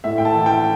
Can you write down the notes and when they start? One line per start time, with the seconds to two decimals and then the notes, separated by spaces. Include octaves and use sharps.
0.04 A2 E5
0.18 G5
0.25 A5
0.36 E3
0.46 G5